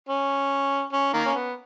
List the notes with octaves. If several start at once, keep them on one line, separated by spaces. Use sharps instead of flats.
C#4
C#4
D#3 A#3
C#4
B3